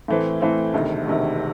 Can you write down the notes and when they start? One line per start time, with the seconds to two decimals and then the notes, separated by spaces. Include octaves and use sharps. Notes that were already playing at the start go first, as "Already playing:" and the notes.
0.08 A2 E3 A3 C4
0.41 A2 E3 A3 C4
0.73 E1 D2 C3 D#3
1.05 E1 D2 C3 D#3